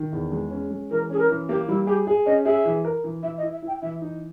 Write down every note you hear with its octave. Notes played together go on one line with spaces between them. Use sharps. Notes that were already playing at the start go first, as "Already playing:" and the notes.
Already playing: D#3
E2
G#3
C#4
G#3
E3 A#4
C#4 G#4
A#4
E3
A#3 G4
G3 E4
G4 G#4
G#4
C#4 D#5
G#4 E5
E3
A#4
E3
E3 E5
D#5
E4
E5
E4
G5
E3 E5
D#4